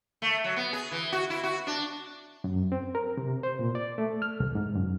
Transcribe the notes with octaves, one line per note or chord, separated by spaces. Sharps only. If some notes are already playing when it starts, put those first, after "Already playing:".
A3
F#3
B3
G#4
E3
F#4
E4
F#4
D4
F#2
C4
A#4
C3
C5
A#2
D5
A3
F6
C2
G#2
F#2